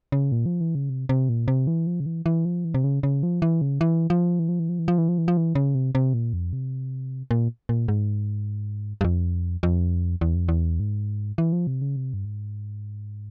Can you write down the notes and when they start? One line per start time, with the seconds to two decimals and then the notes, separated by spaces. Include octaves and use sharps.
0.12 C#3
0.32 A#2
0.46 F3
0.61 E3
0.75 C#3
0.89 C3
1.09 C3
1.29 A#2
1.48 C3
1.67 E3
1.87 F3
2.00 C#3
2.06 E3
2.26 E3
2.45 F3
2.65 E3
2.74 C3
2.84 C#3
3.03 C#3
3.23 F3
3.42 E3
3.61 C#3
3.81 E3
4.10 F3
4.39 E3
4.49 F3
4.59 E3
4.69 F3
4.79 E3
4.88 F3
4.98 E3
5.08 F3
5.18 E3
5.28 F3
5.37 E3
5.55 C#3
5.75 C3
5.95 C3
6.14 A#2
6.33 F2
6.53 C3
7.31 A#2
7.69 A#2
7.88 G#2
9.01 G2
9.04 F2
9.63 F2
10.21 E2
10.35 F2
10.48 E2
10.80 G#2
11.38 E3
11.52 F3
11.67 C3
11.82 C#3
11.96 C3
12.14 G2
12.25 G#2